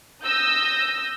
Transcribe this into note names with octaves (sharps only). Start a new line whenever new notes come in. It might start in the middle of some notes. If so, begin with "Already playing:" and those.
D#6 E6 G6 A#6